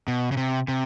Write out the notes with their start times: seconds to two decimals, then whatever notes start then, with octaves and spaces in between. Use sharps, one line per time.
0.08 B2
0.32 C#3
0.37 C3
0.68 C3